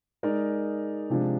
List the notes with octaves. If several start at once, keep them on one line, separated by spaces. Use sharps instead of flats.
G#3 D#4 A#4 D5
C3 F3 G#3 D4